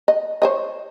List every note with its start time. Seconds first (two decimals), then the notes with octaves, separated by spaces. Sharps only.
0.08 D#5
0.42 C5 C#5 D#5